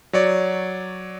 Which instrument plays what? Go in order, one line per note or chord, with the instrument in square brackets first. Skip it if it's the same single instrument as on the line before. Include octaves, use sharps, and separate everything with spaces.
[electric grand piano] F#3 C#5 D5